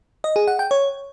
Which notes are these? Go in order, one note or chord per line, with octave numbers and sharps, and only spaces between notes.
D#5
G#4
F#5
G5
C#5